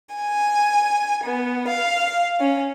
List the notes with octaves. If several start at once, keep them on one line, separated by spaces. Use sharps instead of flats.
G#5
B3
F5
C#4